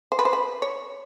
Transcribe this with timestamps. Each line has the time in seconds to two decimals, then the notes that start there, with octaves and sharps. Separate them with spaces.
0.12 C5
0.19 B4
0.25 C5
0.33 B4
0.62 C#5